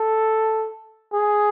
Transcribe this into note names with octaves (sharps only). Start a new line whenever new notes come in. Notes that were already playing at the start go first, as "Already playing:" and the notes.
Already playing: A4
G#4